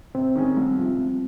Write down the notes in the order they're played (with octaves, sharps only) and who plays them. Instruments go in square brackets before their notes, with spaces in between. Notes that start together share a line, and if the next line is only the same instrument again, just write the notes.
[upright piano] C3 [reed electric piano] C4
[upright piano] D#3 G#3 C#4 G#4
C2
C3 F3
C2